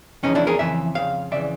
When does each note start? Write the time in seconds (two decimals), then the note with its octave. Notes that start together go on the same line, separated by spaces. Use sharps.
0.23 F2 C#3 E3 C#4 D#4
0.35 D4 E4
0.47 G#4 A#4
0.59 F2 C#3 E3 E5
0.95 F2 C#3 F5
1.31 F2 C#3 E3 D5 E5